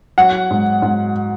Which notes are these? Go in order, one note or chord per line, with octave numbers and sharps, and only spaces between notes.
F#3 F#5
G#2
G#2